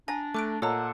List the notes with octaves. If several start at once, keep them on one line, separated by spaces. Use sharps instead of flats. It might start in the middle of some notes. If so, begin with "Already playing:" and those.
D4 G#5 A#5
A3 D6 F#6 D7
A#2 A4 C#5 D#5 F#5 A#5